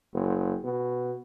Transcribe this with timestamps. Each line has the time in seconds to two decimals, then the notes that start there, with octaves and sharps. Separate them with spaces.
0.14 F#1
0.64 B2